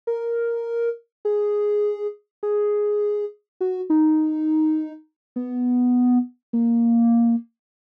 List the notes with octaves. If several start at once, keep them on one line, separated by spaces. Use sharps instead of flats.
A#4
G#4
G#4
F#4
D#4
B3
A#3